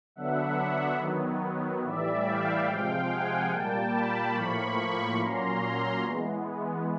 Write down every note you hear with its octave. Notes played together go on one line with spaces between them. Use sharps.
D3 F#3 B3 D4 E5 F#5
D#3 F#3 B3
A2 E3 G3 D5 E5
F5 G5
C3 F3 G#3 F5 G5
F#5 G#5
A#2 G3 A#3 G5 A5
A5 B5
A2 F3 A#3 B5 C#6
A#2 F#3 A#3 C#4 A#5 C6
E3 G#3 B3